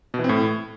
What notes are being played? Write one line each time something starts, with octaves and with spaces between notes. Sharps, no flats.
B2
E3
C4
A2